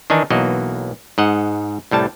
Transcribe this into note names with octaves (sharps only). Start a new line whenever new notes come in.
D#3 E3 D4 D#4 G#5
B1 E3 A#3 F#4 D#5
G#2 D#5 F#5
C2 A2 G3 A5